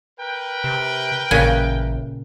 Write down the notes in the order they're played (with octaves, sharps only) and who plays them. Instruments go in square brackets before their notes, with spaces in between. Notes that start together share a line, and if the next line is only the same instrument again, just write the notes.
[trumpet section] A#4 B4 G5
[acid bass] C3
[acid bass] A1 [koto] A#2 C#3 G#5